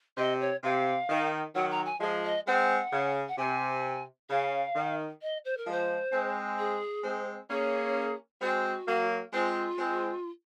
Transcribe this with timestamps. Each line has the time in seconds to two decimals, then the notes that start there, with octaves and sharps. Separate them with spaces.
0.17 C3 D#5
0.40 C#5
0.63 C3 F5
1.09 D#3
1.55 D#3 F#3 F#5
1.71 A#5
1.85 G#5
2.00 F3 G#3
2.24 D#5
2.47 G#3 C4 F#5
2.93 C#3
3.28 F#5
3.38 C3 G#5
4.30 C#3 F5
4.76 D#3
5.22 D#5
5.45 C5
5.57 A#4
5.67 F3 G#3 C5
6.12 G#3 C4
6.58 G#4
7.04 G#3 C4
7.50 A#3 C#4 G#4
8.41 G#3 C4 F#4
8.88 F#3 A#3
9.33 G#3 C4 F4
9.78 G#3 C4